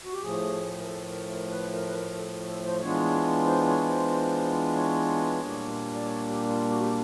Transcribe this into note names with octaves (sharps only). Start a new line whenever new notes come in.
F#4
G4
A2 F3 A3 G#4
A#4
A4
A#4
A#4
B4
A#4
B4
A#4
A4
A4
C5
E3 G#3 B3 D4 F4 C#5
C5
C#5
C5
C#5
A#2 G3 A#3 D4
D5
C#5
G4
F4
F#4
G4